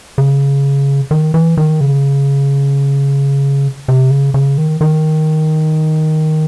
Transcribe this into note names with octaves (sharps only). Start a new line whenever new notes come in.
C#3
D#3
E3
D#3
C#3
C3
C#3
C#3
D#3
D#3